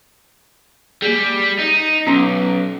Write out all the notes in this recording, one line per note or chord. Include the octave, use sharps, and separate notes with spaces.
G3 A#3 G#4
D#4
B1 B3 C#4 C6